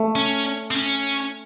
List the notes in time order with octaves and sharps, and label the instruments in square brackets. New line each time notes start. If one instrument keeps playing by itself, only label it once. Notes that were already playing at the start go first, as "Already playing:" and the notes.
Already playing: [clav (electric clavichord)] A3
[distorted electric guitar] C#4
C4
C#4